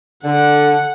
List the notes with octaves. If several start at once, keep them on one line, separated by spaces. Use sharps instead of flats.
D3 F#5